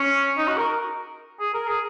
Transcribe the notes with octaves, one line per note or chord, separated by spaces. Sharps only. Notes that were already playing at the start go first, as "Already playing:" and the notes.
Already playing: C#4
D#4
F#4
A#4
G#4
A#4
G#4